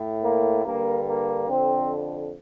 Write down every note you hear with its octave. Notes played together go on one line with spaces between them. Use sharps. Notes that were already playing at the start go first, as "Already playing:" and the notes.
Already playing: A2
A#3
G2 D3 A#3
A#3
F2 D3 C4